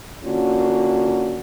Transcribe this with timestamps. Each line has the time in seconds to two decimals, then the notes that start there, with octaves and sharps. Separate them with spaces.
0.23 D3 A#3 C#4 F4 F#4